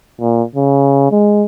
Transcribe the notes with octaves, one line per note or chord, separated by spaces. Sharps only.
A#2
C#3
G#3